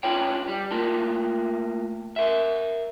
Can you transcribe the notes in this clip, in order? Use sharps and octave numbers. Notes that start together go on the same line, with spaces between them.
C#4 D4 F4 B4 C#5 G5
G3
A3 A#3 F4 A#4
A#4 E5